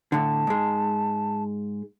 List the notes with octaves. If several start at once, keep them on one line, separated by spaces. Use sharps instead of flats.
A2 D3 A5
G#2 G#3